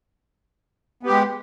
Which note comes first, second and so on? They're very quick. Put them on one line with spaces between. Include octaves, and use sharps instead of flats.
B3 G4 G#3